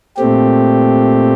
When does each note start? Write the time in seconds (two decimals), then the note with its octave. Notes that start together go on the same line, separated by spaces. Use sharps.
0.17 A#2 A3 C4 G4